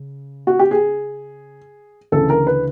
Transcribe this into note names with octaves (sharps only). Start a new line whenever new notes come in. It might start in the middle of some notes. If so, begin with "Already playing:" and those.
Already playing: C#3
F#4
G4
G#4
D2 C#3 E3 A4
A#4
B4